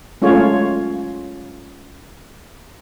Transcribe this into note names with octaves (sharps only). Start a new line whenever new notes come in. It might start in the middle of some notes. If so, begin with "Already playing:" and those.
G#3 A3 C#4 F4 C#5